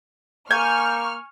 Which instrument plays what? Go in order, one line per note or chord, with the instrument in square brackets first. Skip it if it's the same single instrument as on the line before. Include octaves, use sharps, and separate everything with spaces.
[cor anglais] A#3 [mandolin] G#5 [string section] C#6 F6 [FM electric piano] G6